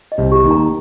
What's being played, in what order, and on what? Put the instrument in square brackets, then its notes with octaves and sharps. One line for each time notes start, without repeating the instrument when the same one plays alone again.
[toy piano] D#5
[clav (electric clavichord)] C2 C3
[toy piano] G4
[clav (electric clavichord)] D#2 D#3
[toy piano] A#5